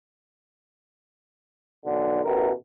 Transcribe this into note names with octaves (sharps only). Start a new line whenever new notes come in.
B1 D3
A1 B2 E3 A#4